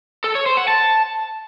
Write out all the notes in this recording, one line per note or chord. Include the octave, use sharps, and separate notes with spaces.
A4
C#5
C5
F#5
A5